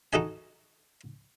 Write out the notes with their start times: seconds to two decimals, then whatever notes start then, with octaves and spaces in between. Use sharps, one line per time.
0.13 D#4 F#4 A4 D#5 G#5